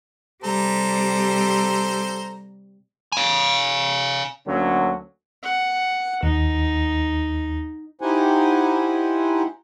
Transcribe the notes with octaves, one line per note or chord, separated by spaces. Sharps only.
C3 G3 A4 C5 A#5
F5 G#5
D2 D3 F#3 A#3 C#4
F#5
D#2 D#4
D#4 E4 G4 C5 F#5 G#5